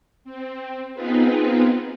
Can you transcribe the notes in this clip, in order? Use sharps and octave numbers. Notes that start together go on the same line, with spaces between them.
C4
B3 C4 D#4 F4 G#4 B4